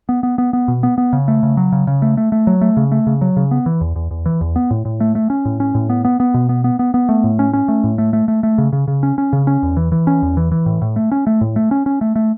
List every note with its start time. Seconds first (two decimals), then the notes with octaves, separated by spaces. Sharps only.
0.09 B3
0.23 B3
0.38 B3
0.53 B3
0.68 B2
0.83 B3
0.98 B3
1.13 C#3
1.28 A3
1.43 C#3
1.57 F#3
1.72 C#3
1.87 C#3
2.02 A3
2.17 A3
2.32 A3
2.47 F#3
2.61 A3
2.77 C#3
2.92 A3
3.07 C#3
3.21 F#3
3.37 C#3
3.51 B3
3.66 E3
3.81 E2
3.96 E2
4.11 E2
4.26 E3
4.41 E2
4.56 B3
4.71 A2
4.85 A2
5.00 A3
5.15 A3
5.30 C#4
5.45 A2
5.60 C#4
5.75 A2
5.90 B3
6.05 B3
6.20 B3
6.34 B2
6.49 B3
6.64 B3
6.79 B3
6.94 B3
7.09 A3
7.24 A2
7.39 C#4
7.53 C#4
7.68 A3
7.84 A2
7.98 A3
8.13 A3
8.28 A3
8.43 A3
8.58 C#3
8.73 C#3
8.88 C#3
9.03 C#4
9.18 C#4
9.33 C#3
9.47 C#4
9.63 E2
9.77 E3
9.92 E3
10.07 C#4
10.22 E2
10.37 E3
10.52 E3
10.66 A2
10.82 A2
10.96 A3
11.11 C#4
11.27 A3
11.41 A2
11.56 A3
11.71 C#4
11.86 C#4
12.01 A3
12.16 A3